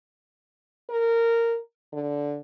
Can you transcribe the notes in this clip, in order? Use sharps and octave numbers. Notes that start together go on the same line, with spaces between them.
A#4
D3